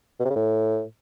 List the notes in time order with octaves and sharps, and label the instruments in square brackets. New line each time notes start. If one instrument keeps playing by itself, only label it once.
[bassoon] B2
C3
C#3
A2